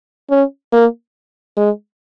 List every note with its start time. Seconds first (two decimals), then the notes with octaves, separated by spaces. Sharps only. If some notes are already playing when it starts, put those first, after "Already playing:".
0.30 C#4
0.73 A#3
1.57 G#3